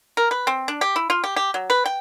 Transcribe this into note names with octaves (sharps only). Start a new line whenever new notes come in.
A#4
B4
C4
D4
G4
E4
F4
G4
G4
F#3
B4
G5